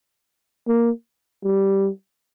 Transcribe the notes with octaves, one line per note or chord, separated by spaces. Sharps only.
A#3
G3